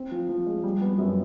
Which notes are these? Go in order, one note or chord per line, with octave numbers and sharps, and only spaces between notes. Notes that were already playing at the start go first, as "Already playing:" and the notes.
Already playing: C4
F3
F3
G#3
G3
B3
F#2